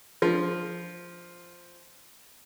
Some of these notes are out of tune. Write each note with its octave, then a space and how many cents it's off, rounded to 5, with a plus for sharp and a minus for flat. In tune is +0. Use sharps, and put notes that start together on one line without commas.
F3 +0